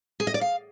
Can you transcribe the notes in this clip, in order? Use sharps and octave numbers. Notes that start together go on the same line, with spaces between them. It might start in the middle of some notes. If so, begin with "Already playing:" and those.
G#4
D#5
D5
F5